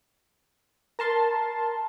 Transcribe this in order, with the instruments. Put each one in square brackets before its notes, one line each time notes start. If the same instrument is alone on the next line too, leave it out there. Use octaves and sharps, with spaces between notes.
[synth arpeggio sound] A#4 A5 C6